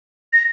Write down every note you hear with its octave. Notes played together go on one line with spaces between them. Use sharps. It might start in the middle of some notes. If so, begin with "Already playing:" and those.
A#6